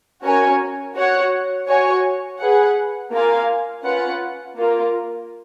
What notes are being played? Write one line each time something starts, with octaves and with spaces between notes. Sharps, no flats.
C#4 F#4 A#4 C#5 G#5
F#4 C#5 F#5
F#4 C#5 G#5
G#4 B4 F#5
A#3 F4 A#4 F5 G#5
C#4 F4 B4 F#5
A#3 F4 A#4